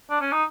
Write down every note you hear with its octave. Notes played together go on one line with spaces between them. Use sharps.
D4
C#4
D#4